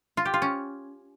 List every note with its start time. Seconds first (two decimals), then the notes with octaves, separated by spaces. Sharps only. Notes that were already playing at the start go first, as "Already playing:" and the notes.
0.17 F4
0.25 G4
0.34 F4
0.42 C#4